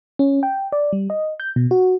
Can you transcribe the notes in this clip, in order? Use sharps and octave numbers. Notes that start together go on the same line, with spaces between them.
C#4
G5
D5
G3
D#5
G6
B2
F#4